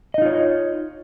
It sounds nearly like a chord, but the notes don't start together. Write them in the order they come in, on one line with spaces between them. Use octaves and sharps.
D#5 D#4 F4 C#5